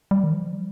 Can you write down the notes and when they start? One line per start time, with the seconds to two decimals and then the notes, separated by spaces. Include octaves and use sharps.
0.11 G3
0.24 D#3
0.32 F3
0.53 G3